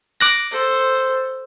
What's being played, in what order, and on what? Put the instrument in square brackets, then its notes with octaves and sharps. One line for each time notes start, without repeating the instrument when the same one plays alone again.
[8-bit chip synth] D6 F#6 A#6
[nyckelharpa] A4 C5